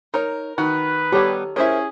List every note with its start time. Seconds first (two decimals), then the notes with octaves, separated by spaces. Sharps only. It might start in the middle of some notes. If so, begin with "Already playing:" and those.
0.14 D#4 A#4 C#5
0.58 D#3 F#4 B4
1.12 G3 B3 G4 A4 C#5
1.56 C#4 E4 G#4 A#4 C5 E5